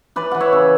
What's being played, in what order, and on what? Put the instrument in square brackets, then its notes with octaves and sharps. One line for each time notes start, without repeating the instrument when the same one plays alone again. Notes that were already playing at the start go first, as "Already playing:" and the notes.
[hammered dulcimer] E3 B4 D5
E3 F#5
C#5 E5
C#3